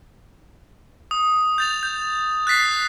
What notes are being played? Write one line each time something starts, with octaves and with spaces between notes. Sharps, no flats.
D#6
G6 A6 F7
G6
F#6 A6 B6 C7